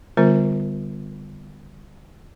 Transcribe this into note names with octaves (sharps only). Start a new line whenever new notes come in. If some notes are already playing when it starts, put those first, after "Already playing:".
D3 G3 B3 F4 A#4 C5